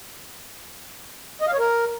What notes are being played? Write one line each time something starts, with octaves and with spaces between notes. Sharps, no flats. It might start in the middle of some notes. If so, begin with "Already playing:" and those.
D#5
F5
C#5
A#4